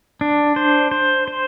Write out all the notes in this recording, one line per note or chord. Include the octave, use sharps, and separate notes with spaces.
D4
C5
C5
C5